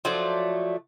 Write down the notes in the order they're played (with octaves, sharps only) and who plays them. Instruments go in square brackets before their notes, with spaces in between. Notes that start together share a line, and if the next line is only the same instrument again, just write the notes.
[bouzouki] F3 F#3 A3 D5